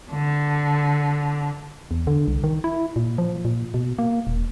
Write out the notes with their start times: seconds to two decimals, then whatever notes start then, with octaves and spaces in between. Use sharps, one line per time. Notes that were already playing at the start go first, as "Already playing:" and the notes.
0.11 D3
1.91 E2
2.07 D3
2.28 C2
2.44 D#3
2.64 E4
2.96 A#2
3.18 F3
3.45 A#2
3.74 B2
3.99 A#3
4.27 D#1